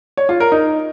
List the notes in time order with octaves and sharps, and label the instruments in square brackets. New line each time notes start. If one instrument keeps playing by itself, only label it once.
[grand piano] C#5
F4
A#4
D#4